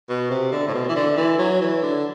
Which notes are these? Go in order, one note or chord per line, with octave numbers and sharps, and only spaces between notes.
B2
C3
D3
A2
B2
E3
D3
E3
F#3
E3
D3